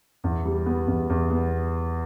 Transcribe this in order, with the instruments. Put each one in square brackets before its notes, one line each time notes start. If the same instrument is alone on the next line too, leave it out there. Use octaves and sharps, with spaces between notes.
[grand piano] E2
G3
B3
E2
E2
B3